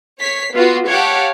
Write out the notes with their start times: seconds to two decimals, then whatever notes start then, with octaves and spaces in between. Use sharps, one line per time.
0.20 C#5 B6 C7
0.53 B3 F4 F#4
0.88 G4 C#5 F5 F#5 A5